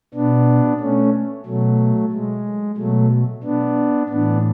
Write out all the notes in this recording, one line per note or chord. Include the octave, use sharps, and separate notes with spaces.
B2 B3 D4
A3 C#4
B2 F#3 A3
G#3
B2 F#3 A3
B3 D4
A2 E3 B3 D4